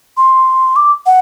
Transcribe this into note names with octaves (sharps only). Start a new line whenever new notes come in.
C6
D6
F#5